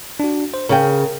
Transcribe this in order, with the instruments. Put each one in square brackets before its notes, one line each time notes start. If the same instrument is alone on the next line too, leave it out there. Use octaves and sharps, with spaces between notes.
[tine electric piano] D4 F#4
C5
[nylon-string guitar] C#3 G#4 G5 [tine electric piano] A#4